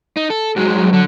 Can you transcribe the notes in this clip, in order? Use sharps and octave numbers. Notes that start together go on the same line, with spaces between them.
D#4
A4
G2 F#3 G#3
D3